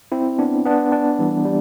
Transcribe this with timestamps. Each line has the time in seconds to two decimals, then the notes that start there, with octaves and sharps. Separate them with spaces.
0.12 C4 E4
0.39 B3 D4
0.65 B3 D4
0.92 B3 D4
1.19 E3 G3
1.45 G3